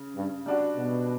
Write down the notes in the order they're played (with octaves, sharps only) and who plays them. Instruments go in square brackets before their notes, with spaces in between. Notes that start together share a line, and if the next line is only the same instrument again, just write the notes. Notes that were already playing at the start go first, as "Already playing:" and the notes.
Already playing: [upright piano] C#3
[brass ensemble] G2
[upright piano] G3 D4 F#4
[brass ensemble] B2